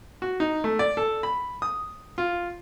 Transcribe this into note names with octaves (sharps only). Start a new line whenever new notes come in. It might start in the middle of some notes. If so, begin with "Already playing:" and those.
F#4
D#4
A3
D5
A4
B5
D#6
F4